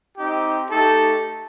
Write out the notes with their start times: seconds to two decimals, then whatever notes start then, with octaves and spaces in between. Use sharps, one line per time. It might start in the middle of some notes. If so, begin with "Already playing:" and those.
0.16 C4 D#4 G4
0.70 A3 D#4 G4 A4